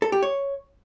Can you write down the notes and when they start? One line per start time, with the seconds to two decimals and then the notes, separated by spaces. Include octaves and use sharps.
0.02 A4
0.12 G4
0.23 C#5